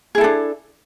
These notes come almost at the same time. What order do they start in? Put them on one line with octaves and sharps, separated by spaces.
G#4 E4 A4 D4